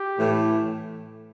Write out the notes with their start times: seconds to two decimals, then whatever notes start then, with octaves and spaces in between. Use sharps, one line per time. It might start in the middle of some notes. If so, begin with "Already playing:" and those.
Already playing: G4
0.18 A2 E3